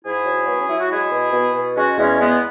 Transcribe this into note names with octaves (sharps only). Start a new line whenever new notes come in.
G#2 E4 G#4
F#3
F#3 B3
C#4
F#3 E4
F#4
G#3 E4 G#4
B2
B2
B2
G#3 C#4 F#4
E2 G#3 C#4
G#3 B3